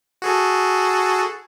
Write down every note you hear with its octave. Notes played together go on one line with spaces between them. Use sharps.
F#4 G#4 A4